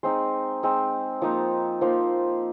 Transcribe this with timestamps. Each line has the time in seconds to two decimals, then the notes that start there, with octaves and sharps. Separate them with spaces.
0.03 G#3 C4 D#4 C5
0.63 G#3 C4 D#4
1.22 F3 A#3 D#4
1.81 F3 A#3 D#4 C5